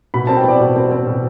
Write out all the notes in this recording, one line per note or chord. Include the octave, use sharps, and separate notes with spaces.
B2 B5
C4 A5
G5
C4 D5
B2
C4
C4
B2